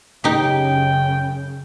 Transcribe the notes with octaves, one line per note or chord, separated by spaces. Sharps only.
F#2 C#3 D#4 G4 G5